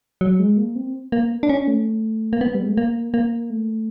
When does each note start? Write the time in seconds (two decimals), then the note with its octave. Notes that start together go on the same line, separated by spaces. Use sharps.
0.21 F#3
0.39 G#3
0.57 A#3
0.76 C4
1.12 A#3
1.43 D4
1.49 C#4
1.68 A3
2.33 A#3
2.41 B3
2.55 G3
2.63 G#3
2.70 A3
2.77 A#3
3.14 A#3
3.50 A3